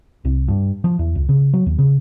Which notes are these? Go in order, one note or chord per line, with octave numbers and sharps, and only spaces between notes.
C2
G2
F3
E2
C#2
C#3
F#3
D#2
C#3